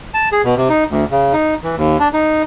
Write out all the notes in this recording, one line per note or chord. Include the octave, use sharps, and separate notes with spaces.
A5
G#4
B2
C3
D#4
D2
C#3
D#4
E3
D#2
D4
D#4